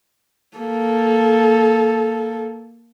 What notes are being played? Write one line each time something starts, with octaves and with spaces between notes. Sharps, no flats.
A#3 A4